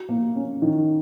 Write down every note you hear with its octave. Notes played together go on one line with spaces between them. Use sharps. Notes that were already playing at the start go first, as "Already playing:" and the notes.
Already playing: F#4
A#3
C#4
D#3